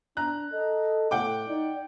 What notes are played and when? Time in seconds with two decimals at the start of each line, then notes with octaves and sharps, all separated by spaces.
0.17 D4 A#5 F#6
0.53 A4 D#5
1.11 A2 F#5 G5 D6
1.48 D#4 D5